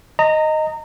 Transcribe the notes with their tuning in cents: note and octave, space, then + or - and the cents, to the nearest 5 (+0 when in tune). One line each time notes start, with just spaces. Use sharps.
D#5 +0 A#5 -25